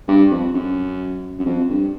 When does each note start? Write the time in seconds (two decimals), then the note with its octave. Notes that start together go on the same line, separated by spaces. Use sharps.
0.08 G2
0.31 F2
0.54 F#2
1.39 F#2
1.46 F2
1.69 G2